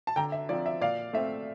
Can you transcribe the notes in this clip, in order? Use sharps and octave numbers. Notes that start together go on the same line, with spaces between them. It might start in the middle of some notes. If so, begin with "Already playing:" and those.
A5
D3 G5 A#5
E5
F3 C4 D5
E5
A#2 D5 F5
A3 C4 E5